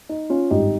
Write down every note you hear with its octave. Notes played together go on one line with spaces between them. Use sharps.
D#4
C#4 F4
G#1 G2 G3 D#4 G4